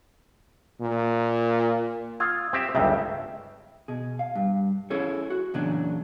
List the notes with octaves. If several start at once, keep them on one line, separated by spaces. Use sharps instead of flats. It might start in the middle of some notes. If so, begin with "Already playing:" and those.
A#2
F4 D#6 E6 G#6
C4 G4 E5 E6
G1 C#2 C#3 E5 G5 A5
B2 G#4
F5
G2
C#4 E4 G#4 A4 C#5
F#4
E2 A#2 C#3 F#3 D4 D5